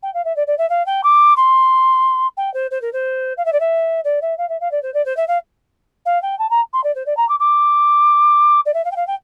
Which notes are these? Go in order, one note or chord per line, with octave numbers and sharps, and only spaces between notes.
G5
F5
E5
D5
D5
E5
F5
G5
D6
C6
G5
C5
C5
A#4
C5
F5
E5
D5
E5
D5
E5
F5
E5
F5
D5
C5
D5
C5
E5
F5
F5
G5
A5
A#5
C6
D5
C5
D5
A#5
D6
D6
D5
E5
F5
G5
F5
G5